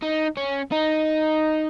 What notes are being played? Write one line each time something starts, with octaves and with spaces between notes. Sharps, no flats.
D#4
C#4
D#4